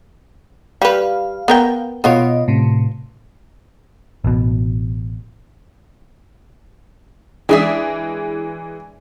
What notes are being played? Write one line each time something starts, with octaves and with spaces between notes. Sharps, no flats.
G3 B4 F5
B3 A#4 G5
B2 B3 F4 C#5 D#5
A2 C3
A1 B2
E3 G#3 D4 G#4 E5